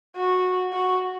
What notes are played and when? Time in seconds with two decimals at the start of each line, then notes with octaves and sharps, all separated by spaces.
0.17 F#4
0.73 F#4